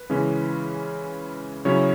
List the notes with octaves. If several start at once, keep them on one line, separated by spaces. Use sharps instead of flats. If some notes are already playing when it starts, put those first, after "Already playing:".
Already playing: B4
C#3 E3 G#3 C#4 E4
C#3 F#3 C#4 E4 C#5